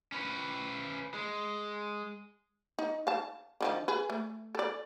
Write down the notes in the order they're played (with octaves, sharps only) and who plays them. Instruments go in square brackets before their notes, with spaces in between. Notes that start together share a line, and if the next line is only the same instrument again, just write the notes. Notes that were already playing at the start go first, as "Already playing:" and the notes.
[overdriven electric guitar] C#4 B4
G#3
[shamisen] D#4
F5 A5
D3 D#3 F3
G#4 B4
A3
A4 D5